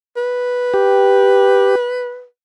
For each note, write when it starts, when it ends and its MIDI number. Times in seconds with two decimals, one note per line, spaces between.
0.17 2.24 71
0.74 1.75 67